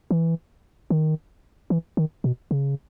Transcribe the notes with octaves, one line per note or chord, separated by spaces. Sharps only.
E3
D#3
E3
D#3
B2
C#3